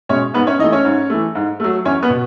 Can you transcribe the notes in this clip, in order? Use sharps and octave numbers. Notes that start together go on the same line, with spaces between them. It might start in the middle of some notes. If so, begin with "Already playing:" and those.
B2 G#3 C#4 C#5
G#2 B3 B4
C#4 C#5
E3 A3 D#4 D#5
C#4 C#5
G#2
E3 A3
G#2
F#3 A3
E2 C#4 C#5
B3 B4
B2